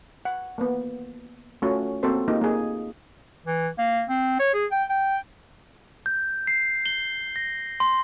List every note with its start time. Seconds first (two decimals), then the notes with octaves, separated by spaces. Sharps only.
0.25 F#5
0.58 A#3 B3
1.62 A3 C#4 F4 F#4
2.03 A#3 C4 F#4 A4 C5
2.28 A#3 D#4 F4 G4
2.42 A#3 G#4
3.46 E3
3.78 A#3
4.09 C4
4.40 C#5
4.54 G#4
4.72 G5
4.90 G5
6.06 G6
6.47 C7
6.86 G7
7.36 A#6
7.80 C6